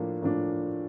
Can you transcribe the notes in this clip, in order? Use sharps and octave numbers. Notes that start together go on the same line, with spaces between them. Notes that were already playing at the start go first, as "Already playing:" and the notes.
Already playing: A2 F3 A#3 D4
A2 F3 A#3 D4